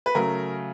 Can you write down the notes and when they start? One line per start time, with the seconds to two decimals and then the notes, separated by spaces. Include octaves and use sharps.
0.06 B4
0.15 C#3 F#3 A3 A#4